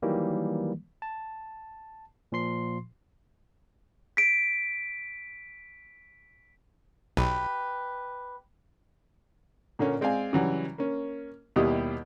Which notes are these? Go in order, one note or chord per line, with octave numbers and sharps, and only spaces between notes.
D#3 E3 F#3 G3 A#3
A5
A#2 F3 C6 C7
B6 D7
B1 G4 B4
A#2 D3 A#3 C#4
G#3 C4 D5 F5 G#5
C#3 E3 F#3 G3
A#3 C#4
D#2 B2 G3 E4 G4 D#6